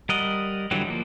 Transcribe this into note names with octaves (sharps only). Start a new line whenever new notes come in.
G3 A#4 D#5 F#5
D3 E3 F#3 G3
F3 A#3